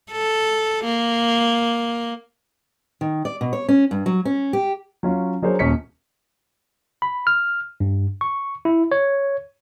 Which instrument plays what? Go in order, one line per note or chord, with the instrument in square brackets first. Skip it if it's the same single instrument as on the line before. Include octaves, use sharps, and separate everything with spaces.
[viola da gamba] A4
A#3
[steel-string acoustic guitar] D#3
D5
B2
C#5
C#4
G2
F#3
C#4
G4
[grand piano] F#3 C#4 F4
F#3 D4 G#4 A#4 C5 C#5
D#1 C#4 B6 C#7
[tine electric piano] B5
F6
G2
C#6
E4
C#5